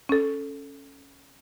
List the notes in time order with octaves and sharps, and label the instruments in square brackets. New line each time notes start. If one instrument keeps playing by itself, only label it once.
[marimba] C#4 A4